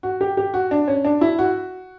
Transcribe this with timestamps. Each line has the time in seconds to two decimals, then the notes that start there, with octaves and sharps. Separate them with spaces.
0.03 F#4
0.21 G4
0.37 G4
0.54 F#4
0.71 D4
0.88 C#4
1.05 D4
1.21 E4
1.39 F#4